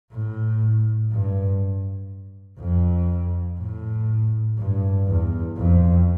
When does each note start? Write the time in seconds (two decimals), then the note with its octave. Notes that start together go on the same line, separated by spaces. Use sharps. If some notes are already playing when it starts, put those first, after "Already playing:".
0.13 A2
1.11 G2
2.60 F2
3.60 A2
4.58 G2
5.08 E2
5.57 F2